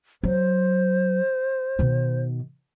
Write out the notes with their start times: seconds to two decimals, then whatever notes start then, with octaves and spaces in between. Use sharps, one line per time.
0.23 F#3 C5
1.79 B2 D#3